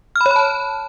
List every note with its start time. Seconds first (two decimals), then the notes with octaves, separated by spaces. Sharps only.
0.16 F6
0.21 B5
0.26 C#5
0.31 B5
0.36 A5